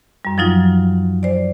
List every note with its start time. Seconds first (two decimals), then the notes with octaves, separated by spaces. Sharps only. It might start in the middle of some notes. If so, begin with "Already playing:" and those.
0.25 F#2 G3
0.38 F3 F#3 D#4 F4
1.23 C5 D5